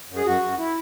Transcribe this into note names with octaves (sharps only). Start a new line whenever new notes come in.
F#2
G#4
F#2 F#4
F#2
E4